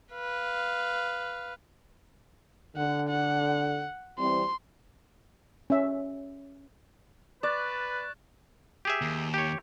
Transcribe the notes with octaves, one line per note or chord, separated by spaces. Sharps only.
B4 F5
D3 F#5
F#5
E3 G3 C4 C6
C#4 E5
B4 D5 C#6 F#6 A6
G4 G#4 E5
D#2
G4 C#5